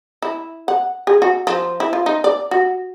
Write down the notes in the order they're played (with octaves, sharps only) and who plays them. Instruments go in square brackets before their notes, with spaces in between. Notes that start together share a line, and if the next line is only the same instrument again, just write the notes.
[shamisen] E4
F#5
G#4
F#4
F3
E4
F4
D#4
D5
F#4